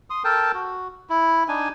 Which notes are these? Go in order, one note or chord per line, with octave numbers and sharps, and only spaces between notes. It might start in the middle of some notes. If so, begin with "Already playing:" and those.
C6 D#6
A4 A#4 G5 A5
F#4
E4
D4 D#4 G#5